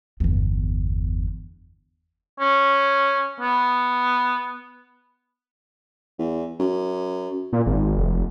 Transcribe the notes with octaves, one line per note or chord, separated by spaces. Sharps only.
G1 E2
C#4
B3
E2
F#2
A#2
G#1
F1